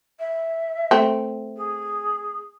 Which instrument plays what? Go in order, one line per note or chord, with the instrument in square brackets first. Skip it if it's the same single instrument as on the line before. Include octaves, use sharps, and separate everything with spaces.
[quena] E5
[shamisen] A3 C4
[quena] G#4